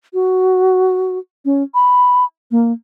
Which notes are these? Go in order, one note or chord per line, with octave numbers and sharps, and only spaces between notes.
F#4
C#4
B5
A#3